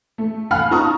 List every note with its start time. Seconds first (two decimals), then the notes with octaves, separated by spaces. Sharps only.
0.18 A3
0.51 F5 F#5 G#5 B5 F6 F#6
0.71 D#4 F4 A5 A#5 C#6 D#6